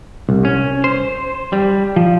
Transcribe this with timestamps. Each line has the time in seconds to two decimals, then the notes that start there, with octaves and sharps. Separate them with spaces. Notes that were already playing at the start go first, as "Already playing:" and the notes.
0.29 C2
0.45 C#4
0.84 C5
1.53 G3
1.96 F3